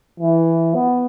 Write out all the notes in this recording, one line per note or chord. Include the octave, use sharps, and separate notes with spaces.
E3
B3